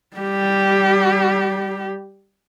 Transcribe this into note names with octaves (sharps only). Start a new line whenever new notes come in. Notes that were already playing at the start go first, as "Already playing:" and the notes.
G3 G4